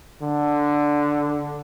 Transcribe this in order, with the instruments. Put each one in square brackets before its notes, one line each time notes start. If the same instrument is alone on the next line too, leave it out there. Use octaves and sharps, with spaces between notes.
[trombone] D3